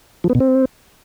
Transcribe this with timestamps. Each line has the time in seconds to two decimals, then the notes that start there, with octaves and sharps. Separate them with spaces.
0.24 F3
0.30 B3
0.35 B2
0.40 C4